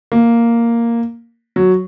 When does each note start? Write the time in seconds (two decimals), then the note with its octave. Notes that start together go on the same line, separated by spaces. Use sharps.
0.12 A#3
1.56 F#3